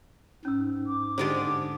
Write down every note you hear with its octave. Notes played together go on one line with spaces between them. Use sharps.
G#2 C#4 E6
D6
D3 G#3 G4 C5